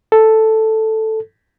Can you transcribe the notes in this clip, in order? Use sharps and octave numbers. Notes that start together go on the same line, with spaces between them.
A4